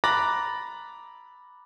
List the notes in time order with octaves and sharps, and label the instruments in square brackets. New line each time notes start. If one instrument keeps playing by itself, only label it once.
[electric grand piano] A#5 B5 D6 F#6 A6 A#6